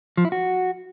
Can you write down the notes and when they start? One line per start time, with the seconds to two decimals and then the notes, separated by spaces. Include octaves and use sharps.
0.17 F3
0.25 E4
0.32 F#4